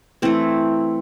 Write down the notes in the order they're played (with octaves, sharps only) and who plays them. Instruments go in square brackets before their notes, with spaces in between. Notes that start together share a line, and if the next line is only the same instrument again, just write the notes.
[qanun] E3 A3 C4 C5